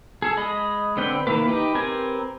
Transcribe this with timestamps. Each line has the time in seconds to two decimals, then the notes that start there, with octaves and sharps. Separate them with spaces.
0.22 G#4 A4
0.37 G#3 D#5 B5
0.97 D3 C4 B4 G5 F#6
1.27 D#3 E3 A3 A#3 B4
1.48 D#4 G4 B4
1.75 C4 G4 A#4 B4 G#5